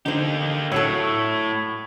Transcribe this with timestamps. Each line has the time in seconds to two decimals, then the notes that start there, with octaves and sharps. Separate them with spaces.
0.06 D3 A#3 D#4 G4 C5
0.72 A2 F#3 F#4 A4 C#5 E6